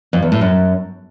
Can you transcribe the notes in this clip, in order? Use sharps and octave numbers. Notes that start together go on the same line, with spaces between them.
F2
E2
A2
F#2